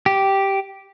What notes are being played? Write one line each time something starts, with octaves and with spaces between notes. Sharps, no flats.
G4